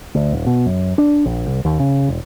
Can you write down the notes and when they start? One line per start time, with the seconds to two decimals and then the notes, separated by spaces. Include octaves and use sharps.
0.15 D2
0.33 D#1
0.46 B2
0.66 F#2
0.98 D4
1.25 A#1
1.46 C2
1.65 D#2
1.80 C#3
2.08 E1